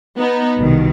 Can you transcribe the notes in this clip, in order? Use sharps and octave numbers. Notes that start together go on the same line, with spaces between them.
B3 D#4
C2 B2 D#3